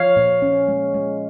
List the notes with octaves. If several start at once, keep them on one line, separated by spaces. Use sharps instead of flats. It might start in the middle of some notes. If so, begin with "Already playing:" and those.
Already playing: F3 C#5 F5
A#2
C#4
G#3
G#3